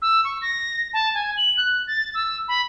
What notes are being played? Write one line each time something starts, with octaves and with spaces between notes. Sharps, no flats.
E6
C#6
A#6
A5
G#5
F#7
F#6
A6
E6
B5